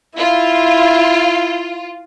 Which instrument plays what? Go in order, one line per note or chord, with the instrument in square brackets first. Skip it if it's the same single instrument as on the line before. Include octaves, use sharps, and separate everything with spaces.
[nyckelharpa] E4 [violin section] F4